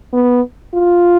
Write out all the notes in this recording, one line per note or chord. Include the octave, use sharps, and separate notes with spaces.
B3
F4